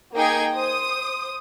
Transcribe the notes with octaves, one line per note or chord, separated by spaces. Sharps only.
A#3 D#4 G#4 G5 G#6
C5 D#6